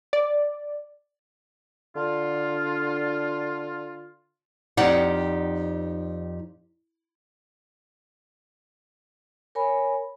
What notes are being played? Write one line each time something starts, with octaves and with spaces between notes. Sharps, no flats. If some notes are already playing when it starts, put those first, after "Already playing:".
D5
D3 F4
F2 D#4 G4 D5 F5 F#5
A#4 C#5 G#5 B5